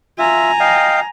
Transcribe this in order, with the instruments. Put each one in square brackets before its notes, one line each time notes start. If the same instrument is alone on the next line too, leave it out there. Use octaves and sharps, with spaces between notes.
[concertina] F4 E5 [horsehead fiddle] G#5 A#5
[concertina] D#5 F5 G5